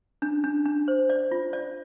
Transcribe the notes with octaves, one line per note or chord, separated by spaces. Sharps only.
D4
D4
D4
C5
D5
F4
D5